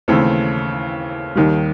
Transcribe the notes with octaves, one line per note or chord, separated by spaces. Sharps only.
D#2 C#3 E3 A3 C4
D#2 D#3 G3